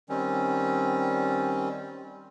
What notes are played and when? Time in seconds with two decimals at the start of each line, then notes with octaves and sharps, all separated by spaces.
0.09 D#3 G3 C4 C#4